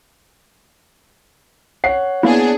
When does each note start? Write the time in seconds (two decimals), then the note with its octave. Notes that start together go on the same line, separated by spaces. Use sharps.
1.84 C#5 F#5 C7
2.23 A#3 B3 D4 E4 G#4